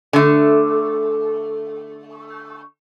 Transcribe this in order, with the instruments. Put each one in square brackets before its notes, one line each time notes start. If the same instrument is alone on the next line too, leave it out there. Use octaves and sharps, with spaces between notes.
[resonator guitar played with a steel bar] D3 A3